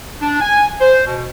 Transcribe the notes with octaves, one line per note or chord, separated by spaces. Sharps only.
D4
G#5
C5
B2